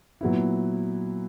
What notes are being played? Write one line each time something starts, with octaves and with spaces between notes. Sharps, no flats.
A#2 F#3 B3 E4